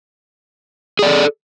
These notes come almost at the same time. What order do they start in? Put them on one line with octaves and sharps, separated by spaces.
G#4 D5 A4